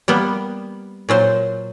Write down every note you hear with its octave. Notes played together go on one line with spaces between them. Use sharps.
G3 A#3 B3
A#2 F#3 C5